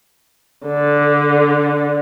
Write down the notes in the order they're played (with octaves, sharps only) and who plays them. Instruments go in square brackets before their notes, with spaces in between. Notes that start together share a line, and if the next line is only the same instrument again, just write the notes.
[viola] D3